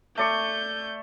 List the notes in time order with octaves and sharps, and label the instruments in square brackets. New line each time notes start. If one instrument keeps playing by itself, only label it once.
[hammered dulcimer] A3 D5 C#6 [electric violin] G6